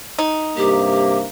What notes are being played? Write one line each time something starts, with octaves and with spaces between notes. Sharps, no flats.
D#4
G2 C3 A#3 G4